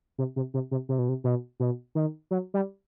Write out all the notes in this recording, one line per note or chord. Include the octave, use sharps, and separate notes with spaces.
C3
C3
C3
C3
C3
B2
C3
B2
B2
D#3
F#3
G3